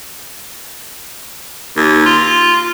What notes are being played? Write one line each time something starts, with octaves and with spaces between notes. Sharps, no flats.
D#2
F4